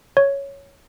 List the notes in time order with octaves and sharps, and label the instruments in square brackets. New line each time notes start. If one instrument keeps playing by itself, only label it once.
[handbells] C#5